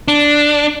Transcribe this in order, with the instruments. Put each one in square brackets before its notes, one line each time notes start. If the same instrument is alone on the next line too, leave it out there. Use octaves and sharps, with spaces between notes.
[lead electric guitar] D4